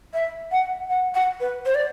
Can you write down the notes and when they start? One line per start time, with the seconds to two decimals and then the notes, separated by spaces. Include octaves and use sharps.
0.14 E5
0.52 F#5
0.90 F#5
1.14 F#5
1.40 B4
1.66 C5
1.75 D5